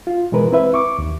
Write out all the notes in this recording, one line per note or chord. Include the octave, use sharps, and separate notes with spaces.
F4
B2 E3 G#3 A#4 B4
C4 E4 B4 E5
C#6 D6
D#2